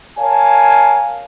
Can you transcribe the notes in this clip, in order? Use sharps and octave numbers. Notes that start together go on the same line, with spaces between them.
A#4 C#5 F5 G#5 A5